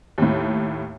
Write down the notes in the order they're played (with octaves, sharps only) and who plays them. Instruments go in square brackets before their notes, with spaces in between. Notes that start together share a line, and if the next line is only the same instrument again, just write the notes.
[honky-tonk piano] D#2 A2